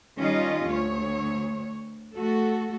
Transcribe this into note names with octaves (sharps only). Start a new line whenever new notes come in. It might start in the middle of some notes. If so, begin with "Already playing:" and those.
D#3 G3 C#4 F4 D#5
D2 C#5
A3 F#4 A4